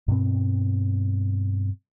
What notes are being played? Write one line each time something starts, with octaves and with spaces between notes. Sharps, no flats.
G2 B2 C4